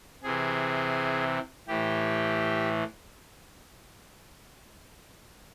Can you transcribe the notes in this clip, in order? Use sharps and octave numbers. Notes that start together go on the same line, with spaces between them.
C3 E3 G#4
A2 E3 G4